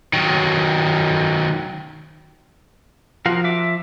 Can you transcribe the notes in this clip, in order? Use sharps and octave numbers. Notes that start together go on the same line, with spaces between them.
D#3 F#3
F3 F#4 A#4 F5
E5 D6